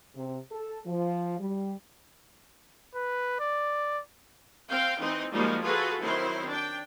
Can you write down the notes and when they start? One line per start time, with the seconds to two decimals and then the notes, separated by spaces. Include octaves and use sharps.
0.15 C3
0.51 A4
0.86 F3
1.39 G3
2.95 B4
3.40 D5
4.70 C4 F5 G5
5.01 E3 C4 D#4
5.32 F3 G3 G#3 A#3 D#4 F#4
5.61 F4 F#4 G#4 A4 B4
6.00 D#3 F#3 C4 E4 C5
6.49 D4 G5